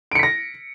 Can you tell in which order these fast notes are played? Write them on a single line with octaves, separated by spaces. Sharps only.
D7 C#7 B6 A#6